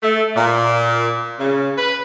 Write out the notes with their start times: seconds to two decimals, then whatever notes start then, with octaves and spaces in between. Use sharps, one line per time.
0.03 A3
0.36 A#2
1.39 C#3
1.77 B4